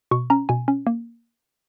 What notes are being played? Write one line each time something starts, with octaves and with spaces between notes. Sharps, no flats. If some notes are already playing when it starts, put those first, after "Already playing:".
B2 C#6
C#4 A#5
B2 G#5
C#4
A#3